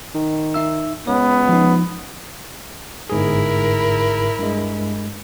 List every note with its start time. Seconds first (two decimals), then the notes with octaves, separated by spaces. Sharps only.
0.15 D#3
0.54 D#4 E5 E6
1.07 C#2 B3 C#5
1.49 F3 D#4
3.10 G1 G#2 E4 G#4 A#4
4.39 G2 G#3